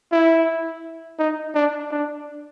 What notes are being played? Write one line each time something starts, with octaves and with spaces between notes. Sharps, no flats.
E4
D#4
D4
D4